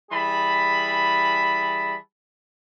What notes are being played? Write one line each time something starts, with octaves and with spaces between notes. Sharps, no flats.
E3 G3 G#4 A5 B5